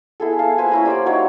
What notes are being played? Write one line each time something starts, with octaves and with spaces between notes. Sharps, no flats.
B3 E4 G#4 A4
F5 A5
A#3 B4 C5 G#5
C#4 E4 A#5
G3 C5 D5
F#3 D#4 C#5